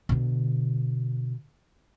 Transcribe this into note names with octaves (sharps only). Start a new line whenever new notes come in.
B2 D3